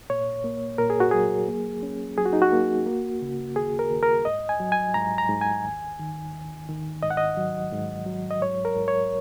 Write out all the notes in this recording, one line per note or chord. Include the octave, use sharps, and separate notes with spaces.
A#2 C#5
A#3
A#2 A#4
G#4
F#4
F#3 G#4
A#3
C#4
F#3 G#4
F#4
D#4
F#4
A#3
A#3
C#3
D#2 G#4
A#4
D#2
A#4
G#2 D#5
G#5
F#3
G#5
G#2 A#5
A#5
G#2
G#5
D#2
D#3
D#2
D#3
G#2 D#5
F#5
D#5
F#3
G#2
F#3
D#5
G#2 C#5
A#4
G#2
C#5